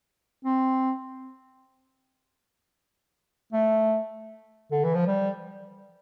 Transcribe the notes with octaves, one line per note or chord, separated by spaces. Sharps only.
C4
A3
D3
E3
F3
G3